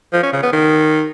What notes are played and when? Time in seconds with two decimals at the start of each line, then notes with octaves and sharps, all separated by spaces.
0.13 F3
0.23 C#4
0.33 C#3
0.43 B3
0.53 D#3